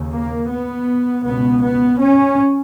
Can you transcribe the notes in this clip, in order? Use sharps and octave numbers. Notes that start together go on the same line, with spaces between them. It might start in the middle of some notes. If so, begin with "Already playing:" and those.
Already playing: D#2 C#3
A#3
B3
C#2 B2 B3
B3
C#4